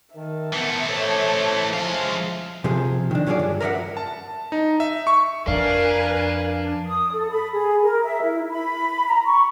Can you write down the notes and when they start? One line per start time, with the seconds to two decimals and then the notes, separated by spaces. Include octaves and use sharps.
0.15 D#3 E5 A5
0.53 E3 A3 B3
0.88 A4 C5 C#5
1.73 F3 G#3 F5
2.64 C3 F3 G#4
3.11 D#3 D4
3.26 D3 F#3 F4 G4 G#4 D5
3.39 G2
3.60 A#4 B4 D5 E5 F#5
3.97 A5
4.52 D#4
4.80 E5
5.07 C#6
5.47 F2 D4 A#4 B4 F5 G#5
6.86 D#6
7.12 A4
7.30 B5
7.53 G#4
7.83 A#4
8.04 E5
8.22 E4
8.49 B5
9.08 A#5
9.25 C#6